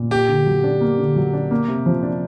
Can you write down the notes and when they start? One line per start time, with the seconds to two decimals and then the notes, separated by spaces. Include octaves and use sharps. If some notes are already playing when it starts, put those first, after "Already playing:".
Already playing: A#2
0.11 A#3 G4
0.28 D3
0.46 F#3
0.64 D4
0.81 A#3
0.98 D3
1.16 F#3
1.33 D4
1.51 A#3
1.68 C3
1.86 F3
2.03 D4